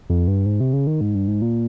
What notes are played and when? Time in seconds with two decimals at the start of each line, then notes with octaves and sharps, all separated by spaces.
0.10 F2
0.28 G2
0.46 G#2
0.60 C3
0.73 C#3
0.87 D#3
1.01 G#2
1.15 G2
1.28 G#2
1.42 A#2